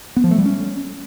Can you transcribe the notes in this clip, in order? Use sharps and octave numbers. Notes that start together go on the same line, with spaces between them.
B3
F3
A3
G3
C#4